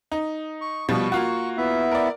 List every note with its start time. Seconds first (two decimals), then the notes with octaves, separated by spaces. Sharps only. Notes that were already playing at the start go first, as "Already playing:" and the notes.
0.12 D#4
0.61 C#6
0.89 B2 F3 G3 C#6
1.12 A#3 F4 F#4
1.57 B3 E4 E5
1.91 A#4 D5